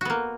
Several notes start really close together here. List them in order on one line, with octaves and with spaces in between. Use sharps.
F#4 B3 A#3